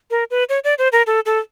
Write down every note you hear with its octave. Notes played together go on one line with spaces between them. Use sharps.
A#4
B4
C#5
D5
C5
A#4
A4
A4